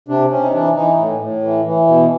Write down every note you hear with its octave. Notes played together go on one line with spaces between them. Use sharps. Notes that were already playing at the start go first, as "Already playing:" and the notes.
C3 D4
C3 C#4
D#4
E3 D4
E3 D#4
A2
A2
E3
E3
B2